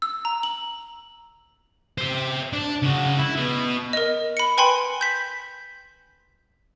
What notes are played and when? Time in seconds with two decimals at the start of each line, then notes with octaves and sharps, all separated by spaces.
0.02 E6
0.25 A#5
0.43 F#7
1.98 C5 E5
2.53 D4
2.82 C#3 F#4
3.17 E4
3.37 B2
3.93 A#4 D#5
4.37 B5 C#7
4.58 B4 G5 G#5 B5 C6
5.01 G6 B6